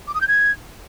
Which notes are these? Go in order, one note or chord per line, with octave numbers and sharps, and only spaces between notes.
D6
D#6
G6
G#6